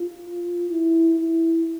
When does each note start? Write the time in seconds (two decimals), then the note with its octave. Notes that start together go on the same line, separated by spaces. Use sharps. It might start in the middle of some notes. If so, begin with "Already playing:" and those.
Already playing: F4
0.69 E4
1.18 E4